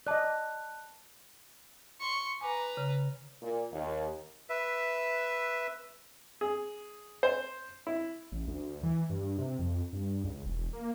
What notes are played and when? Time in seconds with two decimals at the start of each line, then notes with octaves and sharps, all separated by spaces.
0.07 D5 D#5 A5 F#6
2.00 C6 C#6
2.41 B4 G#5 A#5 D6
2.77 C#3
3.42 A#2
3.72 D#2
4.49 B4 E5
6.41 G#4
7.23 C5
7.87 E4
8.32 A1
8.47 D2
8.83 E3
9.10 G2
9.38 C3
9.59 F2
9.93 G2
10.24 C#2
10.45 E1
10.73 A#3